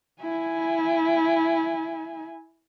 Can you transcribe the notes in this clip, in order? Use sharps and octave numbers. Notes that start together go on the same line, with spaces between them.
E4 G#5